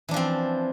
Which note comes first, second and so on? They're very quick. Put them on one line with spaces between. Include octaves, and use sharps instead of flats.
E3 D4 F3 C4